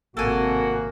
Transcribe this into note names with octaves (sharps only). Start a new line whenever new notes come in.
G#1 A2 C3 A#3 F#4 A4 G#5